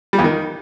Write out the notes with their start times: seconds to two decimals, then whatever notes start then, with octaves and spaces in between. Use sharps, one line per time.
0.13 G3
0.19 E2
0.24 D#3